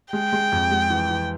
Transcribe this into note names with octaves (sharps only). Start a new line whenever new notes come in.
G#3 G5
G#3
F2
G#3
E3
E3